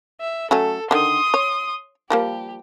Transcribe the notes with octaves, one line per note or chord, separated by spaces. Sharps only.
E5
F#3 A3 C#4 A4
D3 D#3 C6 D#6
C#5
F3 G3 A#3 G4